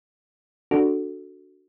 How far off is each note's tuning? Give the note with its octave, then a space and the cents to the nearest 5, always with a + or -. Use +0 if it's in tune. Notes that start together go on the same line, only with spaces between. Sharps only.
D4 +0 F#4 +0 A4 +0